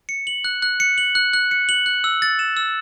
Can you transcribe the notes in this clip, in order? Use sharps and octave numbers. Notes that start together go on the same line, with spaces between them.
C#7
F#7
F#6
F#6
C#7
F#7
F#6
F#6
C#7
F#7
F#6
E6
A6
E7
E6